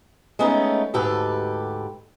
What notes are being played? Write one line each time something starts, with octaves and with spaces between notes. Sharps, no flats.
G#3 A3 B3 C#4 D#4
D2 G#2 G4 A4 B4